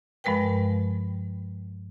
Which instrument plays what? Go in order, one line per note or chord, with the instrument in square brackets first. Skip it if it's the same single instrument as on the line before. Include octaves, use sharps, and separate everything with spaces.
[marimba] G2 F3 G#3 A#4 B4 G5